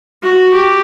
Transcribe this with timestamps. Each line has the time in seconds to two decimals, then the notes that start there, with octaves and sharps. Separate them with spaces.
0.22 F#4
0.53 G4